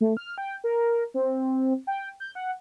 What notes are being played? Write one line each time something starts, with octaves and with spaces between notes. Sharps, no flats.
A3
F6
G5
A#4
C4
G5
G6
F#5